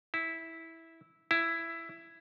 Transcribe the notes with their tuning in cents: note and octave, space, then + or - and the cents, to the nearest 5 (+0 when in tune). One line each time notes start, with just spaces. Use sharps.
E4 -10
E4 +10